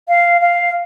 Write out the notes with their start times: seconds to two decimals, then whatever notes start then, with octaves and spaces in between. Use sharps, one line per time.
0.08 F5
0.41 F5